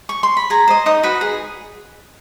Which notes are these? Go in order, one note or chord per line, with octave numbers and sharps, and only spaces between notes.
C#6
C6
B5
G#4 A#5
C5 D#5
D#4 D#6
F#4 B4 D#5
G#4